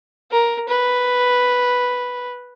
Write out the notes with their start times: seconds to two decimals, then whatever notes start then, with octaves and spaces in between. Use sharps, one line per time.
0.31 A#4
0.69 B4